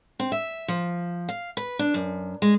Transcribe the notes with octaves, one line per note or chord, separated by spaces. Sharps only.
C4
E5
F3
F5
B4
D4
F#2
G#3